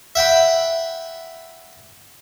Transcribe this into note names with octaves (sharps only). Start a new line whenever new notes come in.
E5 F#5 G5 B5